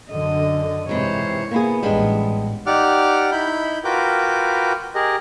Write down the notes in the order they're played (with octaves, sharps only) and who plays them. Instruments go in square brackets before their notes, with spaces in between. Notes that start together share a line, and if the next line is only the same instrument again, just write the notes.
[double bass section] F#2 D3 [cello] D#5
[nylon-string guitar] G#2 E3 [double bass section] C3 [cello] C5 C#5
[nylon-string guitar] A#3 E4 G#4 [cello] B3
[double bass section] A1 G#2 [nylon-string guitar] G3 G#3 D4
[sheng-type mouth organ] D#4 G4 D5 F#5 D6 F6
D#4 E4 B5 G6
F4 F#4 A#4 B4 G5 D6
G4 G#4 A#4 D#5